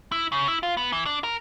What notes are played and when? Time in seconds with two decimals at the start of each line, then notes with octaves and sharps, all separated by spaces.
0.12 E4
0.32 C#3
0.48 E4
0.63 F4
0.77 B3
0.92 E3
1.06 D4
1.24 A#4